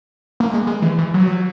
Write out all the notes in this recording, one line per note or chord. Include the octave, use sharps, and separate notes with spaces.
A#3
G#3
G#3
E3
E3
F#3